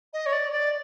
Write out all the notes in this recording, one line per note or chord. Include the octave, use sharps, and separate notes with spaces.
D#5
C#5
D5
D5